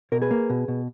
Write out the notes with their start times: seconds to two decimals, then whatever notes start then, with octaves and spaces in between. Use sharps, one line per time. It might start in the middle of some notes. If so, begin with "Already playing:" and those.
0.12 B2 A#4
0.22 G#4 B4
0.31 A#3
0.50 B2
0.68 B2